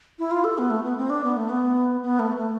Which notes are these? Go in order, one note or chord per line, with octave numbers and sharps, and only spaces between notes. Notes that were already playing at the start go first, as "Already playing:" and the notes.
E4
F4
A4
B3
A3
B3
C4
D4
B3
A3
B3
B3
A3
A3